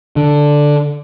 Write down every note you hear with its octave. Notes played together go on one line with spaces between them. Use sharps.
D3